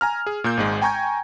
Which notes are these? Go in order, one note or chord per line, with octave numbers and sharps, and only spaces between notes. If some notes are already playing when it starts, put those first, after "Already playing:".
G#5 A#5 F6
G#4
A#2 A#3 G6
G#1 G#2 G#3
G5 G#5 A#5 C#6 G6 G#6